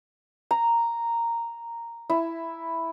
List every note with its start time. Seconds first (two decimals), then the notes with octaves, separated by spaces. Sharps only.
0.51 A#5
2.10 E4